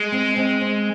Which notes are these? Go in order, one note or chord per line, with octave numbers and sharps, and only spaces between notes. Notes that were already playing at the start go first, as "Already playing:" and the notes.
Already playing: G#3
C4
C4
C4